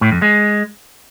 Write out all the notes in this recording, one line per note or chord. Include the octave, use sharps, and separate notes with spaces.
A2
F2
G#3